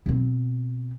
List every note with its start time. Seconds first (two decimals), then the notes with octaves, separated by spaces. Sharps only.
0.06 B2 C4